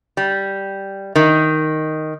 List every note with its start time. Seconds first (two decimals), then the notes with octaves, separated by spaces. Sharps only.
0.17 G3
1.16 D#3